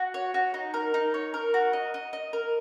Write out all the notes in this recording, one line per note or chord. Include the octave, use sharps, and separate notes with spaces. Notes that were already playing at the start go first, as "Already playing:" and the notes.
Already playing: F#4
C#5
F#4
D#4
A#4
D#4
C#5
A#4
F#4
D#5
D#5
D#5
A#4